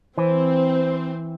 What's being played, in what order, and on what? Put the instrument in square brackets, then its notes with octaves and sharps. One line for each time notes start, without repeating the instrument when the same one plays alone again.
[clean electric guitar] E3 [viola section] C4 [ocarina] C5